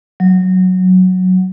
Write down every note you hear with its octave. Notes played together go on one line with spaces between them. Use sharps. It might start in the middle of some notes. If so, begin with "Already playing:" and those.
F#3